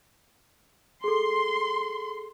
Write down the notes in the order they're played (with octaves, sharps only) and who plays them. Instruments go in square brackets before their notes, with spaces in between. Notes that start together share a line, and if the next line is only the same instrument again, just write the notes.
[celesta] G#4 A4 [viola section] C6